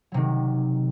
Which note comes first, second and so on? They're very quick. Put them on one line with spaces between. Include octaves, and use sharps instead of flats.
F#3 C3 D#3